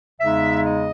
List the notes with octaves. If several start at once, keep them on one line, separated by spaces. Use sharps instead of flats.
E2 C#3 G#3 D#4 E5
D#5